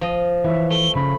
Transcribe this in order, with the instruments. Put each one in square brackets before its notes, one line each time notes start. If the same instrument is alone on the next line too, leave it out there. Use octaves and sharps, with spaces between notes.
[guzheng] F3 D#5
[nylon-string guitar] E3 C#5 [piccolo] E5
[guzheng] A3 [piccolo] G7
[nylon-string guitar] C#3 [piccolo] B5